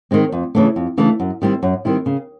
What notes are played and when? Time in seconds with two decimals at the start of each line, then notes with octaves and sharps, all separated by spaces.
0.11 D#3 G#3 C4
0.32 F2
0.55 C#3 E3 A3 D4
0.76 F2
0.97 C#3 E3 A3 D4
1.20 F#2
1.42 D#3 G3 C4 E4
1.63 F#2
1.85 D#3 G3 C4 E4
2.06 C#3